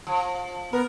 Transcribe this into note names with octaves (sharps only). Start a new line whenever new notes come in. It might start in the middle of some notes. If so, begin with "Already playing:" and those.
F3
B3 A#4